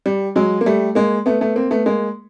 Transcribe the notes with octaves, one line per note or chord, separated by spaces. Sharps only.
G3
F#3 G#3
A#3
G3 A3
G#3 A#3
A3 B3
A3 B3
A#3 C4
A3 B3
G#3 A#3